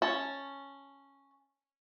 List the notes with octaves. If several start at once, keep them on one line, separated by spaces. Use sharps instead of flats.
C#4 A5